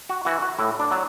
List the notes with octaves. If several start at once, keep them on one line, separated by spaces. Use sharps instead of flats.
F#4
E3 F#4
F#4
A2 E4
D4
F#3